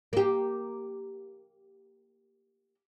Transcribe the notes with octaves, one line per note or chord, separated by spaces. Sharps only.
A#3 G4